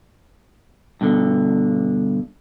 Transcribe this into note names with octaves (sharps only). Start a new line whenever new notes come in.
G2 B2 D3